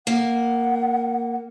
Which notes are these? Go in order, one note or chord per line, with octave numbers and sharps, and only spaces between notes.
A#3 F#5